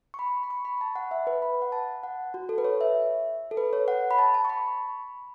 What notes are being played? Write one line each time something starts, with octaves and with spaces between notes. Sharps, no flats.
C#6
B5
B5
C#6
B5
A5
F#5
E5
B4
B5
F#5
A5
F#5
F#4
A4
B4
C#5
E5
A4
B4
C#5
F#5
B5
A5
A5
C#6
B5